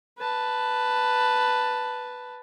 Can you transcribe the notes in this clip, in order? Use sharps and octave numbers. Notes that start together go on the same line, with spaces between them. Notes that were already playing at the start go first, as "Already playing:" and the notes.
B4 A5